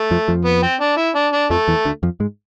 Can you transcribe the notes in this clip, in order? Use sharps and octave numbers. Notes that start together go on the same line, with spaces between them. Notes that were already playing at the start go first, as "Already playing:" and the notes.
Already playing: A3
F2 F3
F2 F3
B3
C4
D4
E4
D4
D4
F2 F3 A3
E2 E3
D2 D3
F2 F3
G#2 G#3